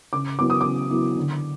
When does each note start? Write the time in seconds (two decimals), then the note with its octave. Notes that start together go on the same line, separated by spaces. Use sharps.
0.13 C#3 D6
0.39 F#3 B3 E4 D6
0.50 D#6
0.61 C#3 D6
0.90 F#3 B3 E4
1.16 D3